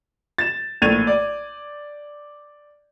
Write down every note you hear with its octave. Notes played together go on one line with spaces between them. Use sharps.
A6 E7
A#1 A2 G#6 A6 D#7 F7
D5